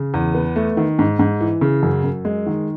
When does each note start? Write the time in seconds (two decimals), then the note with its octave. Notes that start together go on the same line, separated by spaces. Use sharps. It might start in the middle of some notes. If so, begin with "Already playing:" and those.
Already playing: C#3
0.14 E2
0.35 B3
0.56 A3
0.77 D#3
0.99 G#2
1.19 G#2
1.41 E3
1.61 C#3
1.83 F#2
2.04 F#2
2.25 G#3
2.47 D#3